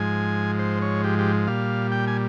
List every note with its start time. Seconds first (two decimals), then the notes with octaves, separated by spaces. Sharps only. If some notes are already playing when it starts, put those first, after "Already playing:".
Already playing: G#2 F3 G#3 G#5
0.59 C5
0.82 C#5
1.04 G4
1.19 G4
1.48 A#2 G3 F5
1.92 G5
2.07 G#5